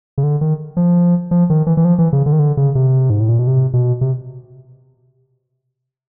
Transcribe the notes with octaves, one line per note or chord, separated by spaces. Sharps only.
C#3
D3
D#3
F3
F3
D#3
E3
E3
F3
E3
C#3
D3
D#3
D3
C#3
C3
G#2
A2
A#2
B2
C3
B2
C3